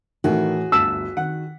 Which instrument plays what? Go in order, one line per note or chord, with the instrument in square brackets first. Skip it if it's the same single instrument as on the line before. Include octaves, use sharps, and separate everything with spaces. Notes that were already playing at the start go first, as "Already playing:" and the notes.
[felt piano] A2 E3 A3 [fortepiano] D#3 [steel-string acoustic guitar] F#4 G#4
[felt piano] G1 D2 B6 [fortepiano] A5 [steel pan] E6
[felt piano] D#3 [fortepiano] F#5